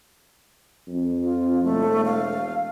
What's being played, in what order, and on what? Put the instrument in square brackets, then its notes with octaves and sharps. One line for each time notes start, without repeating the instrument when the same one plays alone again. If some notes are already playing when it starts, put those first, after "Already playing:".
[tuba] F2
[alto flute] F4
[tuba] E1 [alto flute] A3
[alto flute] F5